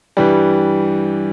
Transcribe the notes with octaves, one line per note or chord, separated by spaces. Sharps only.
G2 E3 G3